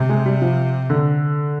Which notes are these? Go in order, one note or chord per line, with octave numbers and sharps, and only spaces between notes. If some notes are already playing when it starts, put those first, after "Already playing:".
Already playing: C3
G#3
G3
F3
D3